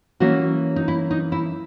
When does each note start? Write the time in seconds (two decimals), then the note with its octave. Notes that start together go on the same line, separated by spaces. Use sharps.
0.20 E3 A#3 C#4 F#4
0.76 D#4
0.88 E4
1.11 D#4
1.32 E4